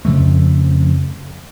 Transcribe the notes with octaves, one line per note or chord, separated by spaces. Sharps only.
F2 C#3 F3 A3